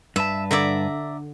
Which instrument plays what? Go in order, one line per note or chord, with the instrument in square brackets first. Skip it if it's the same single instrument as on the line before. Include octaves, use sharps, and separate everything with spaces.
[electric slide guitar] G2 B4 A5 [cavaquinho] E5
[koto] D3 [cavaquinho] D5 E5 A#5